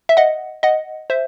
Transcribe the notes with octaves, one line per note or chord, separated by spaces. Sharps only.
E5
D#5 F#5
D#5 F#5
C5 E5